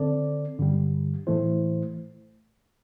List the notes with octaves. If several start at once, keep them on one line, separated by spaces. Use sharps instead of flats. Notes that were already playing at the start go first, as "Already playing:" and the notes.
Already playing: D3 C4 A4 D5
G2 D3 G3
A2 E3 A3 E4 C5